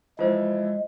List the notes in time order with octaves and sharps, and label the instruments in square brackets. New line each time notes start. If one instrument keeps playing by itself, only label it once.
[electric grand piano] E3 F3 E4 [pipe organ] G#3 [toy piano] F4 C5